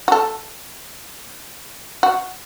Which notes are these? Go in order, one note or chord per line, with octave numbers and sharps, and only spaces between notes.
F#4
A4
F#4